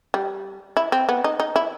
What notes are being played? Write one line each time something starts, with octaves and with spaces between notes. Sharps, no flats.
G3
E4
C4
B3
D#4
D#4
E4